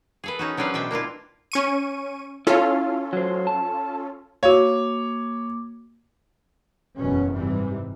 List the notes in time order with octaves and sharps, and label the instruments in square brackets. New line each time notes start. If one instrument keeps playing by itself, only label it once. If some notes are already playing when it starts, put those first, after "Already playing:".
[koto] G#4 A4 B4
C#4 D#4 F#4
F#3 C#4 D4 B4 C5 F5
B2 D4 E5 G5
A#3 D4 E4 F4
[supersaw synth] C#4 C#6 D#7
[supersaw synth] C#4 F4 A4 [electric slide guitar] E4 F5
[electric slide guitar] F#3 C5
A5
[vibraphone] A#3 D6 [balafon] F#4 F5 [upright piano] C#5
[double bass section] F#1 E2 B2 B3 C#4
G#2 C3 E3 G3